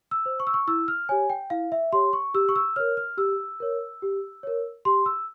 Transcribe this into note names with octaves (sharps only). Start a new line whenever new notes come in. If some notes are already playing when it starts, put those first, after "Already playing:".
E6
C5
C#6
E6
C#6
E4 E6
F6
G4 C#5 G#5
G5
E4 F5
E5
G4 C#5 C6
C#6
G4 E6
C#6
E6
A#4 C#5 F6
F6
G4 E6
A#4 C#5
G4
A#4 C#5
G4 C6
E6